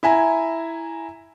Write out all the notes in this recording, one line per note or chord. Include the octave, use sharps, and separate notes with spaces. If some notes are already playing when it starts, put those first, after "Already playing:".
E4 E5 G#5 A#5